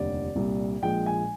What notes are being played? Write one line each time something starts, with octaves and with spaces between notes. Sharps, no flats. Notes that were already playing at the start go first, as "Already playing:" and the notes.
Already playing: F1 D#2 D3 G3 D5
C2 A#2 G3
A#1 A#2 F3 G#3 G5
G#5